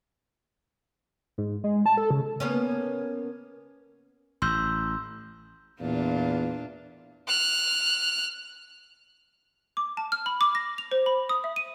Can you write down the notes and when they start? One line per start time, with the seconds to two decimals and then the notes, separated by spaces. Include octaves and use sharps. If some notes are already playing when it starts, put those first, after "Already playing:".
1.38 G#2
1.64 G#3
1.86 A5
1.97 A4
2.11 C#3
2.40 A#3 B3 C#4
4.42 A1 C6 E6 G6
5.81 E2 A#2 D4 F4
7.27 F6 F#6
9.77 D6
9.97 A5
10.12 F6
10.26 B5
10.41 D6
10.55 A#6
10.78 F7
10.91 C5
11.06 B5
11.29 D#6
11.44 E5
11.56 D#7